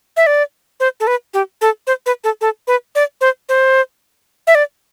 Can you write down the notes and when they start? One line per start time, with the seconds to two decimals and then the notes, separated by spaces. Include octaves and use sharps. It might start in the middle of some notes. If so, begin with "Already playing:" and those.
0.17 E5
0.26 D5
0.80 C5
1.00 A4
1.07 B4
1.34 G4
1.61 A4
1.87 C5
2.06 B4
2.24 A4
2.41 A4
2.67 B4
2.95 D5
3.21 C5
3.49 C5
4.47 E5
4.55 D5